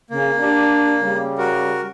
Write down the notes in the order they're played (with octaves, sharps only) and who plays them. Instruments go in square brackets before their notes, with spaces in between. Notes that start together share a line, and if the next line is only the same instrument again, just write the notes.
[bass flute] C#3 [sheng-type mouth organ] A#3
[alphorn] D4 [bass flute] G4
[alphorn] C#3 [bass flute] G3
[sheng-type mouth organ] F#4 A#4